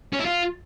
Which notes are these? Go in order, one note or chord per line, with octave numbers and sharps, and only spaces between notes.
C#4
E4
F4